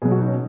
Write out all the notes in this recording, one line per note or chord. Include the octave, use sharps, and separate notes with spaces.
B2 F#3 G#4
F#4
D#4
C#4